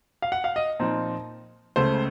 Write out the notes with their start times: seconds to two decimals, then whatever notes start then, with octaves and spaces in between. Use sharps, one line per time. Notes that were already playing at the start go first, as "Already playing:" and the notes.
0.22 F5
0.32 F#5
0.44 F5
0.56 D#5
0.79 A#2 F3 C4 D#4
1.76 C#2 C#3 A3 C5